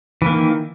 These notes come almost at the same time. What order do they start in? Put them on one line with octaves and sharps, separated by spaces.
E3 A#3 D#3